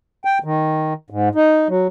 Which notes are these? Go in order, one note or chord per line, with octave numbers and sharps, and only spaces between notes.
G5
D#3
G#2
D#4
F#3